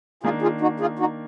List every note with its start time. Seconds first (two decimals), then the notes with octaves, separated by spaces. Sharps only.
0.23 D#3 A#3 D4 F4 G#4
0.42 F4 G#4
0.61 D#4 F#4
0.80 F4 G#4
0.99 D#4 F#4